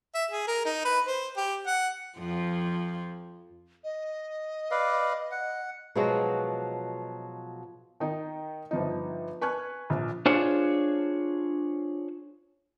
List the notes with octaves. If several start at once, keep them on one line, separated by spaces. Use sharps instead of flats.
E5
G#4
A#4
D#4
B4
C5
G4
F#5
F2 F3
D#5
B4 D5 F5
F#5
B2 F3 F#3 G#3 F#4
D#3 D#4
G1 F3 D#4
B4 G#5 C#6 F6 F#6 G#6
A#1
D4 F4 G#4 C5 C#5